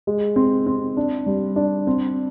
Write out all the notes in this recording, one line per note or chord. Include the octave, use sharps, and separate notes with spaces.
G#3
C4
C4
D4
G3
D4
C4